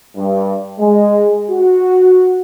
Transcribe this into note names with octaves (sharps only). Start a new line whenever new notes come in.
G2
G#3
F#4